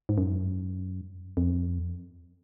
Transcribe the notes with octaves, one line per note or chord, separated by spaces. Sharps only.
G#2
F#2
F2